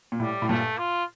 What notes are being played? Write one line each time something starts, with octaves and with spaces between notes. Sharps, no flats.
A#2
A2 G3
A2
G2 A#2 A3
F4